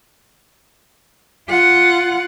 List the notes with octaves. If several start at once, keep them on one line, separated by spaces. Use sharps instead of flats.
F4 F#5